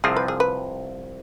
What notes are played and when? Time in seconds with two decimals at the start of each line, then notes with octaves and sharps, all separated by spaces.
0.04 C2 C3 F3 C4 F4 G#4
0.16 B4
0.28 G#4
0.40 B4